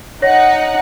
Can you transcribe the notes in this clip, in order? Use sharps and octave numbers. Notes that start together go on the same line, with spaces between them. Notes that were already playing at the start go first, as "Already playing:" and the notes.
D#4 C#5 F#5 A#6